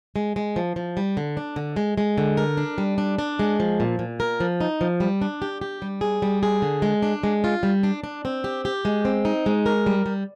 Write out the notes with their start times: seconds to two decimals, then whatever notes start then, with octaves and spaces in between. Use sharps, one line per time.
0.16 G#3
0.36 G#3
0.56 F3
0.76 F3
0.97 G3
1.17 D3
1.37 D4
1.56 D3
1.76 G#3
1.98 G#3
2.18 D3
2.37 A#4
2.57 D4
2.78 G3
2.98 D4
3.19 D4
3.39 G#3
3.60 F3
3.80 A#2
3.99 A#2
4.20 A#4
4.40 F3
4.61 D#4
4.81 F3
5.00 G3
5.21 D4
5.42 G4
5.61 G4
5.82 G3
6.01 G#4
6.22 G3
6.43 G#4
6.62 D3
6.82 G#3
7.03 D4
7.23 G#3
7.44 F4
7.63 G3
7.83 D4
8.04 D4
8.25 C4
8.44 G4
8.65 G4
8.85 G#3
9.05 C4
9.25 D#4
9.46 G#3
9.66 A#4
9.86 G3
10.06 G3